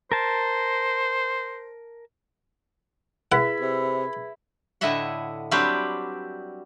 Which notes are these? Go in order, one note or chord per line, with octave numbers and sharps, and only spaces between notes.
A#4 C5 A5
E4 G#4 B4 F#5 B6
C3
A2 D3 E4 D#5 E5 F#5
F#3 G3 C4 D4 G4 B4